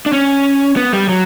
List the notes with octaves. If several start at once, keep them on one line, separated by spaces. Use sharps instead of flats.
D4
C#4
B3
G3
F#3